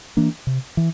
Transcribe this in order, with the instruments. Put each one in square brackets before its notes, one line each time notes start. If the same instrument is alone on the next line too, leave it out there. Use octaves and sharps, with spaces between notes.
[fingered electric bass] E3 A#3 D4
C3
E3